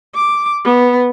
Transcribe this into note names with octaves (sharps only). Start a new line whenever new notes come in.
D6
B3